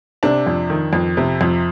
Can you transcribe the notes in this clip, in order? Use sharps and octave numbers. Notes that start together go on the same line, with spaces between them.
C3 D4
F2
D#3
F2
C3
F2